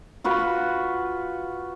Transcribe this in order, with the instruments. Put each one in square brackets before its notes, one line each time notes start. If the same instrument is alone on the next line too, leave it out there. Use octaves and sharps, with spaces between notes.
[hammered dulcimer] F4 F#4 B4